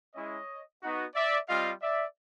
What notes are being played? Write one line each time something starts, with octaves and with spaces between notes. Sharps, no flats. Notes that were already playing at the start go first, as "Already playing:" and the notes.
G#3 C#4 E4 C#5 D#5
B3 D#4 F#4
D5 E5
G3 C4 F4 D#5 F5
D5 E5